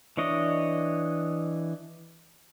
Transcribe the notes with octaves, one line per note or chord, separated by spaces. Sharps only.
E3 D4 C#5 D#5